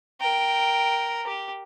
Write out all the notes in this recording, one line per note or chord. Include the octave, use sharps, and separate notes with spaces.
A#4 G5
G4